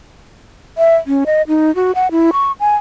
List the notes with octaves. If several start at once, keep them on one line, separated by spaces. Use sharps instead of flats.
E5
C#4
D#5
D#4
F#4
F#5
E4
C#6
G#5